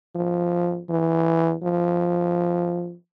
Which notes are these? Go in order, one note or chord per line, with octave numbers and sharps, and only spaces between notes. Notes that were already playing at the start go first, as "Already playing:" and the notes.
F3
E3
F3